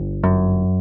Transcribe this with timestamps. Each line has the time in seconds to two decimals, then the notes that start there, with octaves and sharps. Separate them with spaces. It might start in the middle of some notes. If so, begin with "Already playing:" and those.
Already playing: G1
0.23 F#2